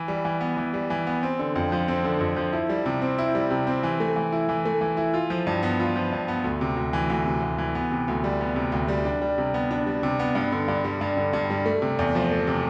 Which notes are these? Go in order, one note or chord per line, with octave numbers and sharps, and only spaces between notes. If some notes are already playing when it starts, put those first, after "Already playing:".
Already playing: E3
G3
E3
B3
E3
G3
E3
B3
C4
D3
F2
F3
C4
D3
F2
F3
E4
G3
C3
C4
E4
G3
C3
C4
E3
A3
E3
E4
E3
A3
E3
E4
F4
F3
G2
B3
F4
F3
G2
B3
D2
C3
D2
E3
D2
C3
D2
E3
B3
C3
D2
G3
B3
C3
D2
G3
D4
G3
C3
B3
D4
G3
C3
B3
G2
D3
G2
G3
G2
D3
G2
G3
A3
C3
E2
F3
A3
C3